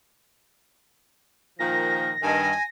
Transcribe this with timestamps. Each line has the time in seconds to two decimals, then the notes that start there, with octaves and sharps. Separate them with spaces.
1.59 A#2 D#3 F3 A#6
2.22 G2 D#3 G#5